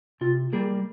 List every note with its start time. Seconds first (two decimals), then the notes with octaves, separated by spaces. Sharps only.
0.21 C3 F4
0.53 G3 A#3 G#4